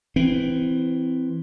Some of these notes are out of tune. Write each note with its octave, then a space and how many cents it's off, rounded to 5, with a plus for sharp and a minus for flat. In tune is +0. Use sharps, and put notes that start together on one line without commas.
E3 +0 C4 -10